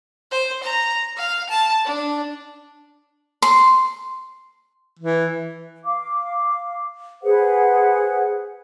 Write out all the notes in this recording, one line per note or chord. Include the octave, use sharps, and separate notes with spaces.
C5
A#5
F5
A5
D4
C6
E3
F5 D6
G#4 B4 C5 F#5